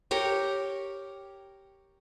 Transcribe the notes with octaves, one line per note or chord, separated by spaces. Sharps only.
G4 A#4 C#5 A#5